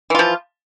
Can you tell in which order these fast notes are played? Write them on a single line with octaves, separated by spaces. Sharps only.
E3 F4 F3